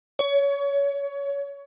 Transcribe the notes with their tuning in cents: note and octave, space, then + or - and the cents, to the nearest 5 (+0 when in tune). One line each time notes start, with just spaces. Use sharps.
C#5 +25